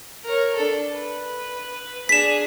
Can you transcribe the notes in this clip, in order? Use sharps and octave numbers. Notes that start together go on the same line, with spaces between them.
A#4 C#5
D4 A4
B4
D4 G#4 B6 E7